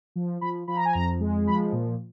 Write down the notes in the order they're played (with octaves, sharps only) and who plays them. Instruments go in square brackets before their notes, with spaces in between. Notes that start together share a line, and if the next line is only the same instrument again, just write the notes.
[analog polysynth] F3
F3 B5
F3 B5
A#5
G#5
F2 A#5
G#3
F3 B5
A#2